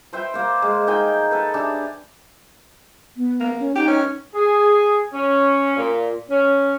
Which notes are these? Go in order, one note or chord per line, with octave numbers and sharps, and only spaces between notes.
B4 C5 E5 G5
A#3 C5
G#3
D#4 A#4 G5 G#5
A4 B4
D4 G4 E5 G#5
B3
A#3
C#4
D#4 G4
C#4
G#4
C#4
A#2
C#4